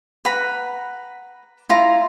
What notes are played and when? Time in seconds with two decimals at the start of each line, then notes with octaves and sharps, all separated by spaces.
0.25 B4 F#5 A#5 B5
1.69 E4 F4 A#5